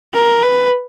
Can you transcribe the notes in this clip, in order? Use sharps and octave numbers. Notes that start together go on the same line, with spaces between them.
A#4
B4